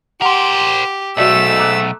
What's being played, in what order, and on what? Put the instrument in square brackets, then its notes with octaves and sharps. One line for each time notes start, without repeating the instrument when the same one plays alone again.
[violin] G4 [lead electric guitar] A#4 C5 [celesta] F#5 C6
[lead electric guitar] B1 [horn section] G#2 A3 [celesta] F#4 D5 D#5 [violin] E6
[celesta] A#5 D6 F#6